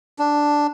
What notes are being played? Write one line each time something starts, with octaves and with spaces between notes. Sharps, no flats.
D4